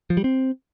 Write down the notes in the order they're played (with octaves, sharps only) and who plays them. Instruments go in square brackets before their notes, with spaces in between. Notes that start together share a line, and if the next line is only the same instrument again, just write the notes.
[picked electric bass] F3
G3
C4